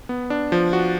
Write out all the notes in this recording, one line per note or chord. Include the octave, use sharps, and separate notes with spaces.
B3
D4
F3
F#4